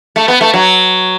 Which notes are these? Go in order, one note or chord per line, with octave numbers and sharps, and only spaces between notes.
A3
B3
A3
F#3